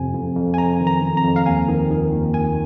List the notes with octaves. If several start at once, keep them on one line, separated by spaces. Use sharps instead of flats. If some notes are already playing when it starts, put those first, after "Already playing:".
Already playing: F2 C3 G#5
F2
F2
G#5
F2 A#5
D#3
A#5
F2
A#5
F2
F5
D#2 G#5
D#3
D#3
D#2
D#3 G#5